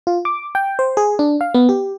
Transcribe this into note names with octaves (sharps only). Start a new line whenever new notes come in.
F4
D6
G5
C5
G#4
D4
F5
B3
G4